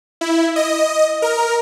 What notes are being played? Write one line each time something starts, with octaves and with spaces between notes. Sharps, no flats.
E4
D#5
A#4